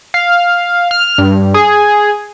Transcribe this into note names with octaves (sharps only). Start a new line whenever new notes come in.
F5
F6
G2
G#4